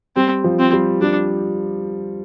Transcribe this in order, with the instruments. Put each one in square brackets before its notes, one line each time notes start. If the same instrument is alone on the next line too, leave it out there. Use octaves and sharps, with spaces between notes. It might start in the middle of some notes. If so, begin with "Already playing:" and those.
[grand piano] G3 [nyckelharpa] C4
[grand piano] F3
[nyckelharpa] C4
[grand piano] G3
[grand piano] G3 [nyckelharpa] D4